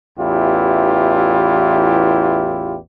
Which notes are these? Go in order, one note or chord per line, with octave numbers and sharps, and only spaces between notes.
A1 E2 E4 F4 G4